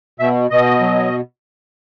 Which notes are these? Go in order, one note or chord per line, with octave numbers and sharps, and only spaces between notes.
B2 E5
B2 D#5
F#3